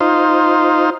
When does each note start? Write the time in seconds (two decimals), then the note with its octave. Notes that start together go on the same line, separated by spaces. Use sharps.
0.01 D#4 F4 C5